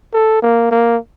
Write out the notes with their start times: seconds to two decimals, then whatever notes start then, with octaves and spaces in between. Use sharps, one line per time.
0.13 A4
0.42 A#3
0.71 A#3